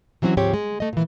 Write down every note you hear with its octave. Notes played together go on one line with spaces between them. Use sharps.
E3 F#3 C4 C#4 F#4
D2 G#2 F3 C4 G4 C#5
G#3
A3 D#5
A#2 E3